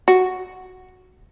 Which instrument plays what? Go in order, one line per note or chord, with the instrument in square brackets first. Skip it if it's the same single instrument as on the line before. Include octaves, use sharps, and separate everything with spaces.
[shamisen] F#4